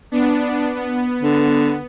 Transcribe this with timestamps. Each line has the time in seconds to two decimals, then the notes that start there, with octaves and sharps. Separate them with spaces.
0.12 B3 D4
0.75 B3
1.22 D3